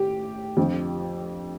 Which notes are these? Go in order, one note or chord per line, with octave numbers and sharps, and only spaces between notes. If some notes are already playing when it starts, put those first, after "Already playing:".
Already playing: A2 G4
F2 D3 F3